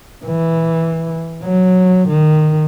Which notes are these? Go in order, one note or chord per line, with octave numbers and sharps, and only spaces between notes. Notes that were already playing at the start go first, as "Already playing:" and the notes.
E3
F#3
D#3